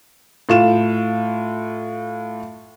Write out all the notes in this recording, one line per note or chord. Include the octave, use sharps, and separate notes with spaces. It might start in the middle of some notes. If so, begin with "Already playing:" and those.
A2 F4 F5 E7